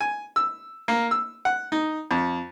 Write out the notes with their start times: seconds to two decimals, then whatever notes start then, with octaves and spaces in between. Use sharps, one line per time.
0.01 G#5
0.36 E6
0.88 A#3
1.11 E6
1.45 F#5
1.72 D#4
2.11 F2